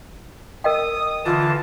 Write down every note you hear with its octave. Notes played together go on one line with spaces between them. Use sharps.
A#4 D#5 G5 D#6
D3 E3 F4 A5